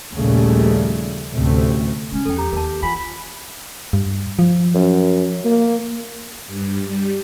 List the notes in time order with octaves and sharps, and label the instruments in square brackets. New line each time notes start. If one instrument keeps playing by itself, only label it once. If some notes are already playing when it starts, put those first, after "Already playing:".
[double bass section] A#1 D#2 A#2 C#3 G3 A3
A1 D2 C3 A3
[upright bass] C#3 G#3 [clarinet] C#4
[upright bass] E2 F3 [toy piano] A4 G5
[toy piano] C#4 A#5 [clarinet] G4
[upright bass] D#2 [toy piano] A#4 A5
[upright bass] E3 [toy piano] F4 F#5 G#5 [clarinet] B5
[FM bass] G2
F3
[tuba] F#2
A#3
[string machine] G2
G3